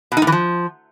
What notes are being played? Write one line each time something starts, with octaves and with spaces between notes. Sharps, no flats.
B2
D#4
A2
E3
F3